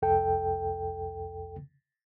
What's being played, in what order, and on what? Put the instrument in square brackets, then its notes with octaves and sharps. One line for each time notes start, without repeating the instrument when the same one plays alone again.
[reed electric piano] C2 F2 A4 G5